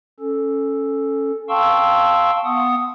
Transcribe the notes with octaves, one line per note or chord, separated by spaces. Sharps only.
C#4 A4
F5 G5 A5 C6 C#6 E6
B3 F#5 D#6